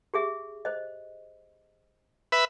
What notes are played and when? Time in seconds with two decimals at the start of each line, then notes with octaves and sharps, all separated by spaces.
0.14 G4 G#4 E5
0.65 C5 D#5
2.32 B4 E5